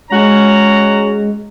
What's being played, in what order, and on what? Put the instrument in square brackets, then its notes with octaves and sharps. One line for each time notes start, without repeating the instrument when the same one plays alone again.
[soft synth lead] G#3 [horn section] C#4 F#4 A#5